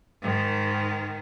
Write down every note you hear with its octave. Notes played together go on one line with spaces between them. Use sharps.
G#2 D#3